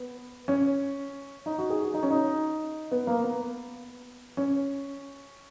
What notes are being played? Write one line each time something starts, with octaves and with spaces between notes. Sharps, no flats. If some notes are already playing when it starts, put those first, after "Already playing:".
Already playing: B3
C#4
D#4
F#4
G#4
F#4
D#4
C#4
D#4
B3
A#3
B3
C#4